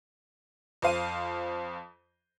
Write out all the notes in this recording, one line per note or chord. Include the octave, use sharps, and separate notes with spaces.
F2 C5 F5 D#7